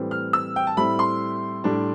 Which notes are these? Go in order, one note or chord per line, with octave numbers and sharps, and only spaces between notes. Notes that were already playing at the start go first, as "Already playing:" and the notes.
Already playing: A2 E3 G3 C4
F6
E6
G5
A5
A2 G3 C4 E4 B5
C6
A2 G3 D4